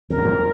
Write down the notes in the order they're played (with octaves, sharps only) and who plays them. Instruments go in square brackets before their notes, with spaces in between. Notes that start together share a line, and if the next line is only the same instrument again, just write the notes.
[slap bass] F2 [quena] A#4
[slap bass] F#2
F2